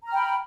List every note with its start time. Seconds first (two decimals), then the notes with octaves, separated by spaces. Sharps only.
0.04 A#5
0.08 F6
0.12 G5
0.16 B5